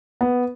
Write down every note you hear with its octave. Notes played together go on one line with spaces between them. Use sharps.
B3